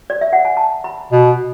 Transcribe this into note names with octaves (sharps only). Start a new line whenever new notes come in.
D5
E5
F#5
G#5
A5
B5
B2